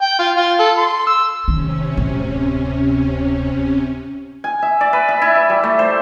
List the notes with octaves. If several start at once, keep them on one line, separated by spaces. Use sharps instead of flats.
G5
F4
F4
A4
C6
E6
C3 D#3 C#4
D1
G#5
E5
D5
B4
E5
E4
E5
G3
A3
C5